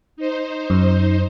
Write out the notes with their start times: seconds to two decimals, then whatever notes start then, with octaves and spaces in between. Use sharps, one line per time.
0.17 D#4 C5
0.70 F#2